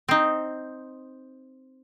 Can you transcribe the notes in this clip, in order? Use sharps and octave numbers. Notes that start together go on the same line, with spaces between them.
C4 D#4